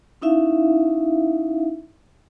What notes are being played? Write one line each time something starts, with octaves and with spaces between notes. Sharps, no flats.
C#4 D#4 E4 E5 F5